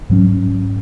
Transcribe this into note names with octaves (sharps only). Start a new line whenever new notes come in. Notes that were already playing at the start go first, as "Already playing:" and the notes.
G#2 F#3 C#4